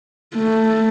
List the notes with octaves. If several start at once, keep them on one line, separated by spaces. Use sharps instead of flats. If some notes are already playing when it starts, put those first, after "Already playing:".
A3